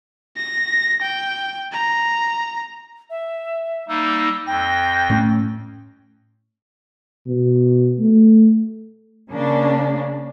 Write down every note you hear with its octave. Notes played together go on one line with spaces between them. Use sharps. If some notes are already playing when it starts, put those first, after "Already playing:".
A#6
G5
A#5
E5
G3 A#3 D#4 E6
F2 G5 A#6
A2 A3 C#4
B2
A3
C#3 A#3 C#4 D4